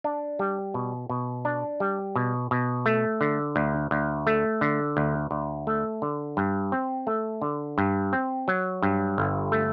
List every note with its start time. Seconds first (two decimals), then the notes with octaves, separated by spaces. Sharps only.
0.04 D4
0.39 G3
0.74 B2
1.09 B2
1.45 D4
1.80 G3
2.16 B2
2.51 B2
2.86 A3
3.21 D3
3.56 D2
3.91 D2
4.27 A3
4.61 D3
4.97 D2
5.31 D2
5.67 A3
6.02 D3
6.37 G2
6.72 C4
7.07 A3
7.42 D3
7.78 G2
8.13 C4
8.48 F#3
8.82 G2
9.18 G1
9.52 A3